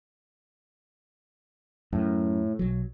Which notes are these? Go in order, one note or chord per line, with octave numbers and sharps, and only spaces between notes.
F#2 A2
B1 F#3